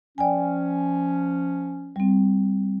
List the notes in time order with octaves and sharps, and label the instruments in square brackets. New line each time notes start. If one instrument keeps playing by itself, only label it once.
[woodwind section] F3 C#4 [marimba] D5 G5 G#5
[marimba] G3 C4